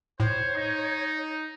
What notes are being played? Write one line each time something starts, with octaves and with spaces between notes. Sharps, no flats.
A2 C5 C#5
D#4